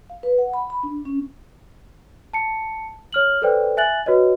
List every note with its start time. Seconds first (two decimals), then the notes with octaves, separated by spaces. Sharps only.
0.10 F5
0.23 B4
0.38 F#5
0.54 B5
0.70 B5
0.83 D4
1.05 C#4
2.34 A5 C#7
3.13 C#5 F6 F#7
3.42 A4 B4 C5 D5 G5
3.77 E5 G#5 F#6 A6 F#7
4.06 F#4 B4 C#5 D#5